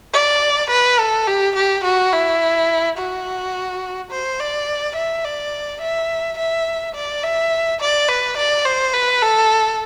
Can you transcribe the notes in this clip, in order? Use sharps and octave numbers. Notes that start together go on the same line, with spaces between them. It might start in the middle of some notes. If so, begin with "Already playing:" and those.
D5
B4
A4
G4
G4
F#4
E4
F#4
C5
D5
E5
D5
E5
E5
D5
E5
D5
B4
D5
C5
B4
A4